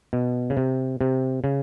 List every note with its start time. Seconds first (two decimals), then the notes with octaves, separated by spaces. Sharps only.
0.13 B2
0.50 C#3
0.57 C3
1.01 C3
1.44 C#3